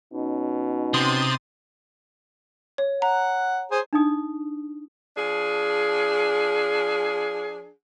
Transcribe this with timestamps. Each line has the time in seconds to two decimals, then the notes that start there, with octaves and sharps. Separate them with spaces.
0.13 B2 C#4 D#4
0.94 C3 C6 D#6 A6
2.78 C#5
3.02 F#5 A#5
3.71 G#4 C5
3.93 D4 D#4 D#6
5.16 F3 D4 G#4